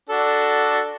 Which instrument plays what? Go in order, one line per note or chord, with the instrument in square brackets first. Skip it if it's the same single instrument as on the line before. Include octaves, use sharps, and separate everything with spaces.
[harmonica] D4 F#4 A4